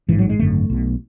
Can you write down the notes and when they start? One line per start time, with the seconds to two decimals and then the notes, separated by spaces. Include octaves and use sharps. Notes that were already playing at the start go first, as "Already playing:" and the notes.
0.09 A1 G#2 E3
0.19 F#3
0.29 G#3
0.39 G#1 F#2 D3 A3
0.70 B1 B2